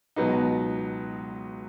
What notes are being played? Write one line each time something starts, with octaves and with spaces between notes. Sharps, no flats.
C#2 B2 F#3 B3 D#4